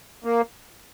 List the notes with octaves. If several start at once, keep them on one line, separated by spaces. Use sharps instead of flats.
A#3